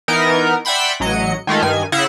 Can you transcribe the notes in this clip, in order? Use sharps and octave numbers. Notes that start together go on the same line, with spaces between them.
E3 B3 D#4 A#4
D5 E5 F#5 G5 B5 C6
A1 F#3 D#5 C#7
D#3 G#3 A3 F4
G2 D#3 G#5
C#3 E4 E5 F#5 A#6 C7